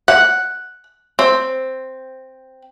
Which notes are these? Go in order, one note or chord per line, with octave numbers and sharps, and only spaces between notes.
F#5
C4